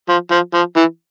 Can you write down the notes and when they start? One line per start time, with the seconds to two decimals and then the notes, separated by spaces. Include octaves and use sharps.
0.09 F3
0.31 F3
0.54 F3
0.76 E3